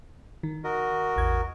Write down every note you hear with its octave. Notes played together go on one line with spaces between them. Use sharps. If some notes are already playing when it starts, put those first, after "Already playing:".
D#3
F#4 A#4 D#5
A1 E2 G#6